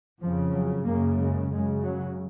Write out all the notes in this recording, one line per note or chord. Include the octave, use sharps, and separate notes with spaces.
F2 C#3 F3
F#3
F#2 C#3 A#3
G#3
F#2 C#3 G#3
F#3